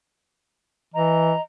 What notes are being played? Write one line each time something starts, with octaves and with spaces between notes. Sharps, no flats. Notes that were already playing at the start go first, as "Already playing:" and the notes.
E3 D#5 A#5